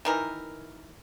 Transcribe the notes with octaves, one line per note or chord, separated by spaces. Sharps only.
D#3 E3 A#4